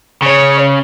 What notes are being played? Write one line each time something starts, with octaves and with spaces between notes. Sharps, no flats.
C#3 C#5